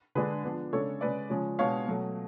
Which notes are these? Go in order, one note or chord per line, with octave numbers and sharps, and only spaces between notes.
D3 G#3 D4 G#4 B4
F3 B3 D4
C#3 G#3 D4 A4 C#5
C#3 G#3 C#4 B4 D5
C#3 F3 G#3 C#4
B2 G#3 D4 C#5 F5
B2 F#3 A3